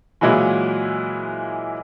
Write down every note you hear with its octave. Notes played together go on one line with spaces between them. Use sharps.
A#2 E3 F#3 G#3 E4 F4